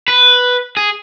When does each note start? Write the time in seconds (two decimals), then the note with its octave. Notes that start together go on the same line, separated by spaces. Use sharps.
0.08 B4
0.77 G#4